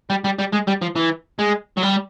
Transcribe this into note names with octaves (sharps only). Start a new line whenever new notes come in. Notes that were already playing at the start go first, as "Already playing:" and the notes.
G3
G3
G3
G#3
G3
F3
E3
G#3
F#3
G3